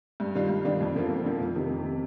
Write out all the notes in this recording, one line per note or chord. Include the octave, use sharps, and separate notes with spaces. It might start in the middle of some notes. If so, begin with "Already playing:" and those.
G2
D#3 G3 D4 F4
G2
D#3 G3 D4 F4
F2
D3 F3 A#3 F4
F2
D3 F3 A#3 F4
F2
C3 D#3
F2
C3 D#3